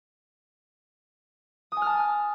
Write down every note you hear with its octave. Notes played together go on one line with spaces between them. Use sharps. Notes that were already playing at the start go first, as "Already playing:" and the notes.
G#5 A5 D#6 F6